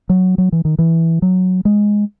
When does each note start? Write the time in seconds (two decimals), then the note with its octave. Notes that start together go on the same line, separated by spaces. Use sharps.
0.09 F#3
0.38 F#3
0.52 E3
0.65 D#3
0.79 E3
1.22 F#3
1.65 G#3